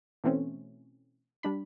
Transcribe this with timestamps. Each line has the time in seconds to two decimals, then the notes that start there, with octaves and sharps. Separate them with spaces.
0.24 B2 E3 A3 C4 C#4
1.43 G3 D4 B5